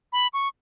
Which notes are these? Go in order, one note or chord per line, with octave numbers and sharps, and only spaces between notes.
B5
C#6